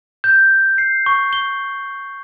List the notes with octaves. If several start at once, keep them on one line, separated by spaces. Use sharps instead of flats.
G6
C7
C#6
G7